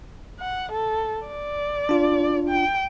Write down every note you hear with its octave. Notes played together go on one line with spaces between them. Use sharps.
F#5
A4
D5
D4 F4
G5